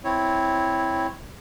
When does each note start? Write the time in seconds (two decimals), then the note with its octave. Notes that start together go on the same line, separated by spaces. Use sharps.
0.04 C4 E4 C#5